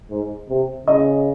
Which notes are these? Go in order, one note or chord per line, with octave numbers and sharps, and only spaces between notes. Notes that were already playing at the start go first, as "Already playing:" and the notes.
G#2
C3
C#3 D#5